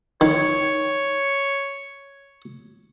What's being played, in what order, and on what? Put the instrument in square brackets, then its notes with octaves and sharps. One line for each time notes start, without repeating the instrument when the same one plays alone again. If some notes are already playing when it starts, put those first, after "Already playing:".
[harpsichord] D#3 [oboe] C#5